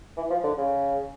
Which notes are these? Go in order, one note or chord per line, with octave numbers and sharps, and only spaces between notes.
E3
F3
D3
C#3